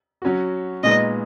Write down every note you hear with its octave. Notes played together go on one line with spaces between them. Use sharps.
F#3 C#4 F#4
A#2 G#3 B3 D#4 D#5